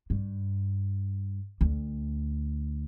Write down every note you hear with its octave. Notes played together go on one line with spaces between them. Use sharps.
G2
D2